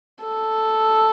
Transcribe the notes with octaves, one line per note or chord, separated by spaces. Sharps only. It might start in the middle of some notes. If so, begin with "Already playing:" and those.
A4